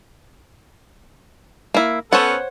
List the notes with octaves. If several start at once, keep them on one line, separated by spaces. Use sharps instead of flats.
A#3 E4
B3 C#4 A4 C5 C#5 F#5